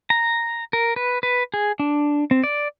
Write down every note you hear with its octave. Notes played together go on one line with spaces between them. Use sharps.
A#5
A#4
B4
B4
G#4
D4
C4
D5